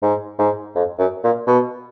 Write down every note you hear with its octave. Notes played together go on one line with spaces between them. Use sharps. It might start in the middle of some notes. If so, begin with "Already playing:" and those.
G#2
G#2
F2
F#2
A#2
B2